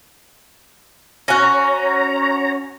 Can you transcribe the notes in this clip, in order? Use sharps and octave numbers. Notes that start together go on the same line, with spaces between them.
C#4 F#4 C#5 A#5